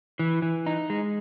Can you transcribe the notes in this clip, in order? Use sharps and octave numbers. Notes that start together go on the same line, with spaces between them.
E3
E3
D#4
G#3